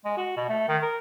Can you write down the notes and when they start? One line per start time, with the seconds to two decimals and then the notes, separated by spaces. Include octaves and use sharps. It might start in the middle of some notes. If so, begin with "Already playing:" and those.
0.05 G#3
0.17 F#4
0.37 B2
0.49 A3
0.68 D#3
0.82 A#4